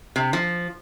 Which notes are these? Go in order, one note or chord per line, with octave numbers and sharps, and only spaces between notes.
C3
F3